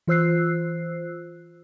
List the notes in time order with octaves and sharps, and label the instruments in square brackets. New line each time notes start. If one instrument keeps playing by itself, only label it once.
[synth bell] E3 F4 C5 E6 F#6 C7